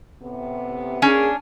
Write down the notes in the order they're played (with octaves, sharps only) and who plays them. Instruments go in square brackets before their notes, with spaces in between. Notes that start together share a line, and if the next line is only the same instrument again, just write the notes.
[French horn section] A2 C3 B3
[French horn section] A#3 G#4 [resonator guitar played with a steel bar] C#4 D4 G#5